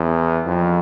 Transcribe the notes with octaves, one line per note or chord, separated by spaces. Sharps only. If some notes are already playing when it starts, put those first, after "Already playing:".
Already playing: E2
F2